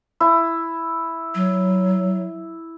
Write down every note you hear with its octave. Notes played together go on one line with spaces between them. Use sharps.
E4
F#3